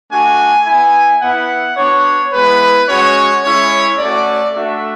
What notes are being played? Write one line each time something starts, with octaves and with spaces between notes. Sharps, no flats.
A3 D4 F#4 G#5
B3 E4 G#5
B3 E4 F#5
B3 D4 F#4 C#5
G#3 B3 E4 B4
G#3 C#4 F#4 C#5
G#3 C#4 E4 C#5
A3 C#4 F#4 D5
A3 D4 F#4 E5